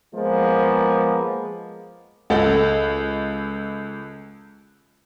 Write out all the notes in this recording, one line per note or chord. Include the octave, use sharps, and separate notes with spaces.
F3 G#3 A#3 B3
C#2 A4